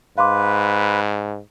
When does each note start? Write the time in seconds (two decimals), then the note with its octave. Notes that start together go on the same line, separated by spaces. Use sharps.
0.18 G#2 B4 F5 C6 D6